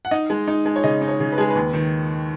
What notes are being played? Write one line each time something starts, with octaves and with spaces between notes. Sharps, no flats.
F#5
D#4 D#5
G#3
D#4
G#3
C#5
C#3 D#5
D#4
C#5
C#3
B4
G#3 G#4
B4
D#2
D#3